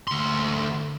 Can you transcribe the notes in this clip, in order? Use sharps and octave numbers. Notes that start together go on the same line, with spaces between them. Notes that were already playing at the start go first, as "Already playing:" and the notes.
D2 C6